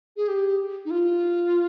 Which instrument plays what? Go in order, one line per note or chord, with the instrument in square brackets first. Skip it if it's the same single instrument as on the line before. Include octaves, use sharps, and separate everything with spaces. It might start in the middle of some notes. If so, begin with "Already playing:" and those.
[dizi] G#4
G4
D#4
F4